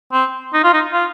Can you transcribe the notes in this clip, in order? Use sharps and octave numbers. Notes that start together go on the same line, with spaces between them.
C4
D#4
F4
D#4
F4